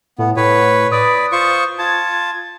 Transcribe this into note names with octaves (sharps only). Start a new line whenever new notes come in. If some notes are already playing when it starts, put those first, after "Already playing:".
A2 B3
A2 B4 C#5
B4 D5 D#6
F4 C5 C#6
F4 A5 G#6